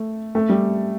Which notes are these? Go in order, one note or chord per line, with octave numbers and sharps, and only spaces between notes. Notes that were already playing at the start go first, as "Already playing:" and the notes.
Already playing: A3
A3
G3